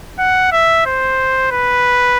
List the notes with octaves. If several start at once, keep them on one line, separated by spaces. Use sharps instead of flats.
F#5
E5
C5
B4